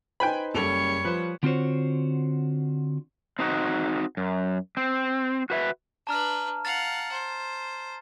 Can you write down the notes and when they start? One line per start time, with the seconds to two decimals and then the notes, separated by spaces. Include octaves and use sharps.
0.20 D#4 B4 C5 G5 G#5 B5
0.54 F#1 C#3 G3 A4 C#5 F7
1.05 F3 B4 C5
1.43 D3 C4 F4 F#4 C5 C#5
3.39 C4 D#4 F#4
4.17 F#2
4.77 C4
5.50 F#4 B4 E5
6.07 D4 B4 A5 A#5 F6
6.65 F5 F#5 A6
7.12 C5